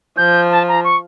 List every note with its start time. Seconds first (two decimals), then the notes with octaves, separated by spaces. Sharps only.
0.17 F3 G6
0.51 A5
0.68 A#5
0.84 C#6